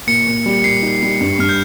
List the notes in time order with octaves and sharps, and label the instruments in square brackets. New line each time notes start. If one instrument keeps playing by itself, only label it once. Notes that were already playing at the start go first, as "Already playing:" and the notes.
[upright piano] A#2 [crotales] C#7
[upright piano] A#2
G3
[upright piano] A#2 [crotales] C7
[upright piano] D#4
G3
G2
[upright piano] G2 [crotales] F6
[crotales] G6